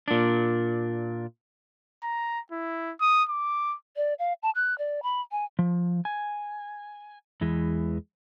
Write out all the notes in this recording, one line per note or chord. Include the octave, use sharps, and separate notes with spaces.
A#2 D4
A#5
E4
D#6
D6
D5
F5
A5
F#6
D5
B5
G#5
F3
G#5
E2 E3 G#3